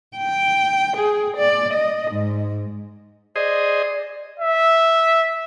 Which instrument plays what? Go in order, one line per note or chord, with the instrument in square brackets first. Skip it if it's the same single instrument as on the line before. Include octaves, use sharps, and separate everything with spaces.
[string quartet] G5
G#4
D5
D#5
G#2
[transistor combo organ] G#4 C5 D#5 [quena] D5
[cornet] E5